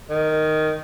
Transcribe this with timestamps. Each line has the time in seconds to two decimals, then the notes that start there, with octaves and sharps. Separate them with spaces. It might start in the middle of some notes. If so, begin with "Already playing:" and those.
0.10 D#3